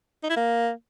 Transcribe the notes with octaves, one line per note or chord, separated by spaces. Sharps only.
D#4
E4
A#3